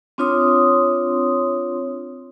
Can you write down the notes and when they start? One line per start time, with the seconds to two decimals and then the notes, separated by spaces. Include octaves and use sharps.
0.18 C4 D4 F4 C#5 C6 D#6